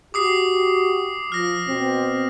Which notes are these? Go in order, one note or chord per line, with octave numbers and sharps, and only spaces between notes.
F#4 G4 D6 D#6 C7
F3 F6 A#6
B2 C4